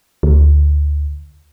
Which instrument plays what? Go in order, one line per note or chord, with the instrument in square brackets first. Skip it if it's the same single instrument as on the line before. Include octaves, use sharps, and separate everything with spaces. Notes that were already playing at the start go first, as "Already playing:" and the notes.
[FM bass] D2